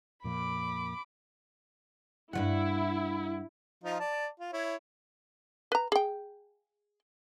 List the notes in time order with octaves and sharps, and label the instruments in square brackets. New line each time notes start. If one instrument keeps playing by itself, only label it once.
[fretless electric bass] F2 A#2 F3 [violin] B5 D6
[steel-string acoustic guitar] G2 F3 F#5 [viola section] E4
[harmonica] F3 D#4 F4
D5 A5
F4
E4 C#5
[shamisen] B4 A#5
G#4 G5